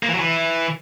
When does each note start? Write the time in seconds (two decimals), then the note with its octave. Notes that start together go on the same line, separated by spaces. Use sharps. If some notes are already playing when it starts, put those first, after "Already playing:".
0.03 A#3
0.09 E3
0.14 F#3
0.20 E3